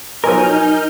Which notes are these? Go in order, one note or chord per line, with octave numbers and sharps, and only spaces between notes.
B2 F3 F#3 D#4 A#4 G#5 F6 G6